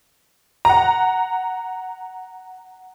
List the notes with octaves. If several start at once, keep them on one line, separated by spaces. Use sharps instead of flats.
F#5 A#5